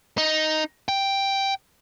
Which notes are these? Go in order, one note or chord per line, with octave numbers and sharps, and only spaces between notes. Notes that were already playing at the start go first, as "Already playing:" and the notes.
D#4
G5